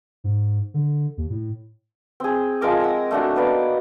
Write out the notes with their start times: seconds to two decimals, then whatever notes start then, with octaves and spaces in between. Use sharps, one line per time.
0.24 G#2
0.74 D3
1.17 D#2
1.30 A2
2.20 C4 G#4
2.61 F3 G#3 A#4 D6
2.80 F#5 E6
3.11 A3 D4 F#4
3.35 A#3 B3 D#4 D5